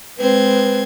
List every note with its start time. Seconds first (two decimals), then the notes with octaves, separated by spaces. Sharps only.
0.18 G#3 C4 B4 G#6